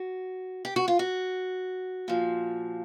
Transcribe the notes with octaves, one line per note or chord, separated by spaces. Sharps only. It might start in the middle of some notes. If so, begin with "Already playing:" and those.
Already playing: F#4
G4
F#4
F4
F#4
A#2 F3